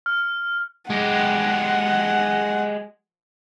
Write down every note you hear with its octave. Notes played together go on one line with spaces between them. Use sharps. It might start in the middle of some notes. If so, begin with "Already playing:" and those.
F6
G#3 G4 F#5